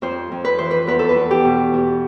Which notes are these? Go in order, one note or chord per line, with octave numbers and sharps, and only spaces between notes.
F2 C5
F2
B4
E3 C5
B4
E2 B4
A4
B4
E2
G4
B2
E2